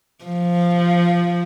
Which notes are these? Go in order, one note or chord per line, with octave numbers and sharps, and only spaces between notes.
F3